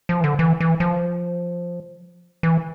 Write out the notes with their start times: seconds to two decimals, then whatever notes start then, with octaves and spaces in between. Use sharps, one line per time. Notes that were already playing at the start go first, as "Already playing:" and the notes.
0.09 F3
0.21 E3
0.24 D3
0.39 E3
0.60 E3
0.80 F3
2.43 E3